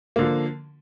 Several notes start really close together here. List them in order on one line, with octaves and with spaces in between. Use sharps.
A#3 D3 F3